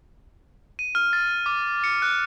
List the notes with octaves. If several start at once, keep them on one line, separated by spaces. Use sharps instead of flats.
D#7
F6
A6
D6
C#7
F#6